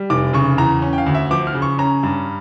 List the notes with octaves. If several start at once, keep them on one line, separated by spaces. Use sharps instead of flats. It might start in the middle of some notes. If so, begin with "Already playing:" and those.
Already playing: G3
F1 D6
C#3 C#6
E2 A#5
C#4
G5
F5
D2
E5
F3 D6
F6
C#3
C#6
C#4 A#5
G2